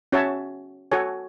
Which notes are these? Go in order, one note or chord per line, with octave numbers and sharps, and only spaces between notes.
C#4 F#4 C#5 E5 A5
F#4 A4 C#5 G#5